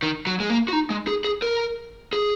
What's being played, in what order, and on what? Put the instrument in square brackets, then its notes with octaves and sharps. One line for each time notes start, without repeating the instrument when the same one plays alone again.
[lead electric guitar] D#3
F#3
G#3
A#3
F#4
D#4
G#3
G#4
G#4
A#4
G#4